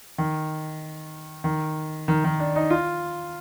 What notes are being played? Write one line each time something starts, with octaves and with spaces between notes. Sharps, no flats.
D#3
D#3
D#3
D#3
D4
D#4
F4